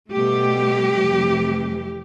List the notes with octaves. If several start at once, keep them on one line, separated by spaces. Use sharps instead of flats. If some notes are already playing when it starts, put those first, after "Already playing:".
B2 G3 A3 G4
F2 C3 E3 A3